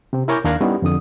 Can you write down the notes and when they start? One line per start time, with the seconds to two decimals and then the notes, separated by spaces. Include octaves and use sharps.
0.13 C3 C4
0.28 E4 A#4 C#5 G#5 D6 G6
0.44 D#2 D4 A#4 F5 F#6 G#6
0.61 G3 B3 C#4 D#4 E4
0.82 F2 D3 D#6